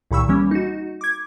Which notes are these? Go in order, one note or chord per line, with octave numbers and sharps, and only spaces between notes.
C2 A#2 D#3 B5 C#6 E6
E3 G3 A#3 C#4
D#4 F#4
D6 G#6